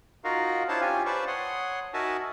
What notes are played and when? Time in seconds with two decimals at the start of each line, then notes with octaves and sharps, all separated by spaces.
0.24 D#4 F4 F#4 A#4 F5
0.69 D4 E4 F4 C5 C#5 A5
0.81 C#4 F4 G4 G#5
1.06 B4 C5 D5 A5 C#6
1.27 C#5 F#5 C6 D#6
1.94 D#4 F#4 A#4 E5 G#5 A5